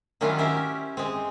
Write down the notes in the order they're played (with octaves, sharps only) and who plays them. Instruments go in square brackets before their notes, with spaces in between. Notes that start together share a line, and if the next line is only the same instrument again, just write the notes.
[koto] D#3 F#3 G3 C#4 E4 F4
C#4 G4 A#4 C5 E5
G#3 C4